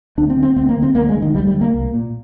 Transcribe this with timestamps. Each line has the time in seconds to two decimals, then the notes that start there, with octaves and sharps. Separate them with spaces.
0.18 D2 D4
0.30 C4
0.37 D3
0.43 C4
0.56 D2 C4
0.69 A#3
0.76 D3
0.82 C4
0.95 D2 A#3
1.09 G#3
1.15 D3
1.22 D#3
1.35 D2 G3
1.47 G3
1.54 D3
1.61 A#3
1.74 C2
1.94 A#2